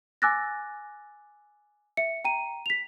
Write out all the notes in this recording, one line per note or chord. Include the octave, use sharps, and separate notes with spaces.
G#5 D6 E6 F#6 A6 A#6
E5 C#7
G5 A#5 D#7
B6 F7